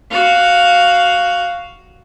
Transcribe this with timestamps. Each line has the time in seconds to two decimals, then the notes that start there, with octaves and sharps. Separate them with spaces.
0.11 F#4 F5